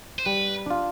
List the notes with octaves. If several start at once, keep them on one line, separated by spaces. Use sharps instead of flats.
C5
G3 B4
D4 F4